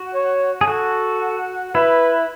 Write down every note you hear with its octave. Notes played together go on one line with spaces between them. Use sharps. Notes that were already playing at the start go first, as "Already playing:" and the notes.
Already playing: F#4
C#5
G#4
F#4 A4
E4 B4